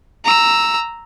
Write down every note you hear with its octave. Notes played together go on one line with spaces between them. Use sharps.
A#5 E6